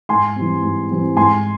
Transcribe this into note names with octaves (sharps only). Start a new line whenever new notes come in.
G#2 G#5 C6
E3 G3 C4
G#2
E3 G3 C4
G#2 G#5 C6